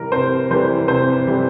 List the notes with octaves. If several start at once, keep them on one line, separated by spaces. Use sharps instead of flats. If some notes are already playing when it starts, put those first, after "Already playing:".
Already playing: C3 E3 G3 A#4
C3 C5
E3 G3 C5
C3 C5
E3 G3